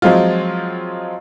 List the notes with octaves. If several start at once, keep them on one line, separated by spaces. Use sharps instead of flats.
F3 F#3 G#3 C4 F4